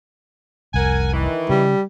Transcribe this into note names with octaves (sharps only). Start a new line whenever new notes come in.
F1 C2 A#4 F#5 G#5
D#3 E3
C#3 G3